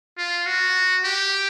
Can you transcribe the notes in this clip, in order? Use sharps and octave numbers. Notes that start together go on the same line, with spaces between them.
F4
F#4
G4